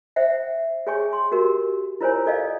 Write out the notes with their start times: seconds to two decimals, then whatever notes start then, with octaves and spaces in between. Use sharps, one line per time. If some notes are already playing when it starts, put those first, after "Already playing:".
0.16 C5 E5 F#5 G5
0.87 G#4 C#5 G5 G#5 C#6
1.13 C6
1.32 F#4 G4 A#4
2.01 E4 F4 A#4 C5 C#5 G#5
2.26 A4 D5 D#5 F5